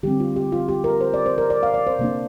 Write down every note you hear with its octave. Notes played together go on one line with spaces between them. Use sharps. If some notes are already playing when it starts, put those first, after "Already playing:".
D3 G3 C4 G4
F4
G4
F4
G4
A#4
C5
D5
C5
A#4
D5
F5
D5
C5
C3 A#3 D4